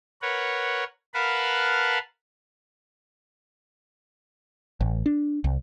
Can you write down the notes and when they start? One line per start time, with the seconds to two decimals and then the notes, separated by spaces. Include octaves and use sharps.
0.22 A#4 B4 C#5 F#5
1.14 A#4 B4 F5 F#5 A5 B5
4.81 A1
5.06 D4
5.44 C2